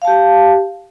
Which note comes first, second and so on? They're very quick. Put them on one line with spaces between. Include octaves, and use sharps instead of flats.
F5 A5 G4